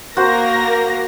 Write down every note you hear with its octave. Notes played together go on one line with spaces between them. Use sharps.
A#3 F#4 A#4 C5 A#6